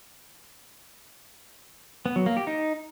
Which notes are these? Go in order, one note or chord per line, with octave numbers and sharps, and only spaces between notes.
B3
F#3
A#3
G4
D#4